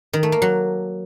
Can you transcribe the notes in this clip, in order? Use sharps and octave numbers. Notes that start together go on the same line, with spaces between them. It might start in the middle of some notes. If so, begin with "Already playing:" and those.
D#3
A3
A#3
F#3